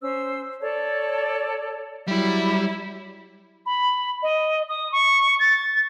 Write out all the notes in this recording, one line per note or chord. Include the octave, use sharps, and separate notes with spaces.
C#4 C5 E6
A4 C#5 D5 A5
F#3 G3 E4
B5
D#5
D#6
C#6
A6